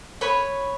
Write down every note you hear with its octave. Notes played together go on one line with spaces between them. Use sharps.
B4 C#5